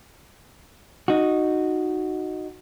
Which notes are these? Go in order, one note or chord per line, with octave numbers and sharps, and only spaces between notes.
D#4 F#4